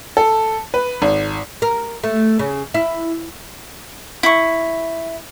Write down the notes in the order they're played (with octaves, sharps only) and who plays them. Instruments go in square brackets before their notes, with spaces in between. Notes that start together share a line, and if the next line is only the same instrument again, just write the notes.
[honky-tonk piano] A4
B4
G#1
[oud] A#4
A3
C#3
E4
[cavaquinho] E4 C#6